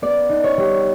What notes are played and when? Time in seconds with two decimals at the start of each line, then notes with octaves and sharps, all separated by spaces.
0.02 B3 D5
0.29 D#4
0.44 C#5
0.57 G3